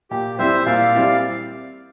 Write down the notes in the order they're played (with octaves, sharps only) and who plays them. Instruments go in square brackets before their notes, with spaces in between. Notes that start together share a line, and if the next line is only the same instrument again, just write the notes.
[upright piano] A#2 [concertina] G4
[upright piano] G3 C4 E4 [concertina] C5 E5
[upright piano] A#2 [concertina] D5 F5
[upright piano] G3 C4 E4